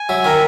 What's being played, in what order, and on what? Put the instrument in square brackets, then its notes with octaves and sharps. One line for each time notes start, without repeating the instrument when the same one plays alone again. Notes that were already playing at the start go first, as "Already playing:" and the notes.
Already playing: [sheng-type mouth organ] G#5
[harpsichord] F#3 [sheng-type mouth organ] E5
[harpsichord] D#3 [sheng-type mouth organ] A#4